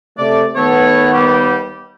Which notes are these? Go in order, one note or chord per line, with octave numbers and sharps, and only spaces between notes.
C3 A3 D5
D#3 A3 B3 C#5
D#2 G3 G4